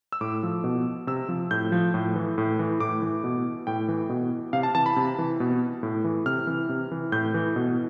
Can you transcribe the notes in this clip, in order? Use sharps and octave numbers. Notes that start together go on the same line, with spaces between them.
E6
A2 D6
F3
B2
C3 E6
F3
A2 G6
F3
A2
E3
A2
E3
A2 D6
E3
B2
A2 G5
E3
B2
C3 F5
A5
E3 A5
B5
C3
E3
B2
A2
E3
C3 F6
E3
C3
E3
A2 G6
E3
B2